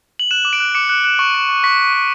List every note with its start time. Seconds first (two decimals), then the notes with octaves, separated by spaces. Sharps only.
0.19 F#7
0.31 F#6 E7
0.45 D6
0.53 D7
0.60 F#6
0.75 D6 C#7
0.89 F#6
1.04 F#6
1.19 C#6
1.34 C#6
1.49 C#6
1.64 C#6 B6
1.78 C#6
1.93 C#6